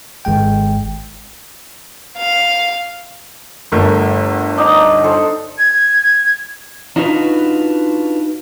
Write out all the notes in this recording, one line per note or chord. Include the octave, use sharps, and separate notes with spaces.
G#1 G#3 G5
F5
G1 A3 A#4
D4 D#4 A#5
A4 C5
G#6
D4 D#4 F4 F#4 G#4 B4